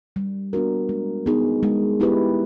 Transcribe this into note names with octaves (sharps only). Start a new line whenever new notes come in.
G3
B3 D4 F#4 A#4
G#3
B3 D#4 G#4
G#3
B3 E4 G4 B4